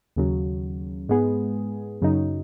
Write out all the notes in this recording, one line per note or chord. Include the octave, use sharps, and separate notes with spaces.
D#2 C#3 F#3
G#2 G#3 B3 G#4
F#2 C#3 F#3 D#4